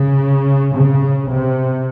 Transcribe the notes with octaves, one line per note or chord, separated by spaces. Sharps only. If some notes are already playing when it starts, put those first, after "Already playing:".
Already playing: C#3
C#3
C3